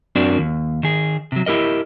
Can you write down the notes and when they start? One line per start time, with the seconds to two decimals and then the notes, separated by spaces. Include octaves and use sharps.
0.16 F#2 C4 D4 F#4 A#4 D5
0.38 D#2
0.83 D#3 G#4
1.32 C3 F#3
1.46 E4 G4 A#4 D#5